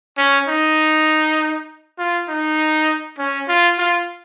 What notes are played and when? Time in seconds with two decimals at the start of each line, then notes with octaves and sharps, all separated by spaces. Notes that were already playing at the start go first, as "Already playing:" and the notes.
0.18 C#4
0.48 D#4
1.98 F4
2.28 D#4
3.18 C#4
3.48 F4
3.78 F4